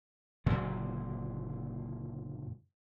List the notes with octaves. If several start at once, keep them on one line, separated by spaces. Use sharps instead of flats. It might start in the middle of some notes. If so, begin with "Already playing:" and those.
F#1 A#2 D3 G#3